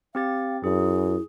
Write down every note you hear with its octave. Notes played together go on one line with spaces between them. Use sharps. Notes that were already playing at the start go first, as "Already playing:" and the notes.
C4 G4 F5 A6
F#2 E4 G#4